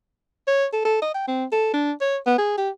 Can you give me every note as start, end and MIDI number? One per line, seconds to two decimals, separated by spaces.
0.47 0.66 73
0.73 0.82 69
0.85 0.97 69
1.02 1.11 75
1.14 1.26 79
1.28 1.45 60
1.52 1.72 69
1.73 1.92 62
2.01 2.17 73
2.26 2.35 59
2.38 2.56 68
2.58 2.70 67